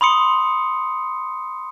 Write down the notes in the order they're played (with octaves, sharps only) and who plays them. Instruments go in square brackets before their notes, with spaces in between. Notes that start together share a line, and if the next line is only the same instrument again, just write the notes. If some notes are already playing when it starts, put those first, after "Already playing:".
[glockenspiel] B5 C6 D#6 C#7